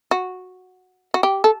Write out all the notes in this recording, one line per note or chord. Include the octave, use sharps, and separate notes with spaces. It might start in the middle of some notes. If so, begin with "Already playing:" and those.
F#4
F#4
G4
A4